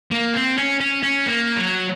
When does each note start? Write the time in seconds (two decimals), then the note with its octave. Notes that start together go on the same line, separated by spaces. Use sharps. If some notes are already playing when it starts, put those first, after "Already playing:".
0.11 A#3
0.34 C4
0.58 C#4
0.81 C#4
1.03 C#4
1.26 A#3
1.57 F#3